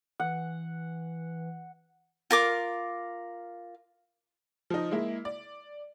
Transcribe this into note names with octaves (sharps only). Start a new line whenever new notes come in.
E3 F#5
F4 A#4 D6
F3 D#4
G#3 A#3 E4
D5